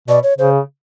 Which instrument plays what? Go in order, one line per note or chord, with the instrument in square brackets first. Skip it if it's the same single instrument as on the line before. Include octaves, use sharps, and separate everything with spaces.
[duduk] B2 [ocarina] D5
[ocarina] C#5
[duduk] C#3 [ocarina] C5